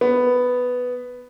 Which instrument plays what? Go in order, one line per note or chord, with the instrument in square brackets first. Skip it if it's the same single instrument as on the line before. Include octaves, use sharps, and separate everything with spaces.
[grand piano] B3